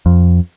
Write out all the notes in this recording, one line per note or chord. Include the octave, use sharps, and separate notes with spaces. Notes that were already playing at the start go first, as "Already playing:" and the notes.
F2